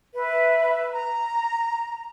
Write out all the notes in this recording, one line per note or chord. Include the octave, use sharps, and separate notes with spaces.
B4 E5
A#5